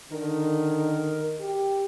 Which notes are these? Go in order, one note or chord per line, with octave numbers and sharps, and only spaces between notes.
D3 D#3 A#4
G4